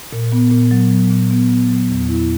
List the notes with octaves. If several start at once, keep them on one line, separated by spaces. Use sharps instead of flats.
A#2
B3
A#2
F#3
F#3
A#2
B3
B3
F#3
E2
E4